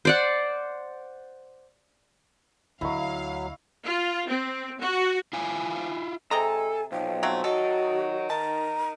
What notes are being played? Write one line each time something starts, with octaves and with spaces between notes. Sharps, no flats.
C5 D5 F#5
D2 F#3 E4 D#5 F5 C#6
F4
C4
F#4
E4 F4 F5 G#5
C3 G#3 A4 D#5 G#5 A#5
B1 F3 G5
F#3 A3 C4
F#3 F#4 A4 A#4 D#5
D#3 A5 A#5